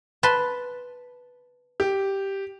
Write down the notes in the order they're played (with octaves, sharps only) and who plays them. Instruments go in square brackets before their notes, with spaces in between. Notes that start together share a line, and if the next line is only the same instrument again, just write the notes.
[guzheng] B4 A5 C6
[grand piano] G4